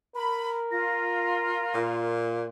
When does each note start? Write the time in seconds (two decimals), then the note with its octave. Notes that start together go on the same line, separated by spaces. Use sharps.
0.16 A#4 B5
0.72 F4 A#6
1.74 A#2